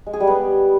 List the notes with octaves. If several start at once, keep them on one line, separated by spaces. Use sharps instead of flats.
G#3
G#4
G3
B3